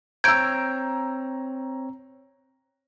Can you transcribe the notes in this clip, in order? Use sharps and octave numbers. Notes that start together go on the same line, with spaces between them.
C4 C#5 A#5 E6 G6 G#6 D7